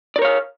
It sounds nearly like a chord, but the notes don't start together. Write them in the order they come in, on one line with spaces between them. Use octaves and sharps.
D5 A#4 C#5 F5